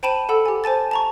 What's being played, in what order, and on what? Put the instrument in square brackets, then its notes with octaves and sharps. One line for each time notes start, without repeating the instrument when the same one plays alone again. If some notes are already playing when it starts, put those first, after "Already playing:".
[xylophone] C5 G5 A5 B5 D#7 E7
A4 F#5 B5 E6
G4 G#5
C5 G#5 A5 A6
A5 A#5 C#6